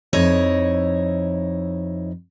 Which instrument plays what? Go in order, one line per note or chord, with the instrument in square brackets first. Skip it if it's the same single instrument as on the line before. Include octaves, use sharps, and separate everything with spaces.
[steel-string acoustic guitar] F2 D#4 E4 C#5